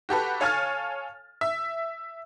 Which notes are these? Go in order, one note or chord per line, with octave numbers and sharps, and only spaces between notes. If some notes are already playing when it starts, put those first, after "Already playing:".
F#4 G4 A4 B4
A4 C#5 F5 G#5 F6 A6
E5